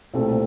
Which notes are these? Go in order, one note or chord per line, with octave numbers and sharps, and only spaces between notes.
C2 A#2 A3 C4